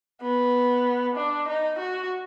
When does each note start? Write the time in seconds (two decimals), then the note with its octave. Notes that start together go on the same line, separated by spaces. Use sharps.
0.22 B3
1.16 D4
1.48 D#4
1.79 F#4